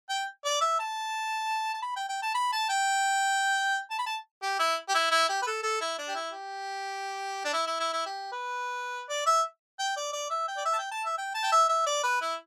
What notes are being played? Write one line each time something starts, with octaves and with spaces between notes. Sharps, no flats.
G5
D5
E5
A5
A5
B5
G5
G5
A5
B5
A5
G5
A5
B5
A5
G4
E4
G4
E4
E4
G4
B4
A4
A4
E4
D4
G4
E4
G4
D4
E4
E4
E4
E4
G4
B4
D5
E5
G5
D5
D5
E5
G5
D5
E5
A5
G5
A5
E5
G5
A5
G5
E5
E5
D5
B4
E4